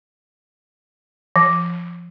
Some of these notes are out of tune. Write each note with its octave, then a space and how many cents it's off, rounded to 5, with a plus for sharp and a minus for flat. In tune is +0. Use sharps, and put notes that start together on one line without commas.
F3 -15